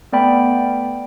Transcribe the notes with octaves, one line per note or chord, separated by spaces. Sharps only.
A3 B3 D5 G5 B5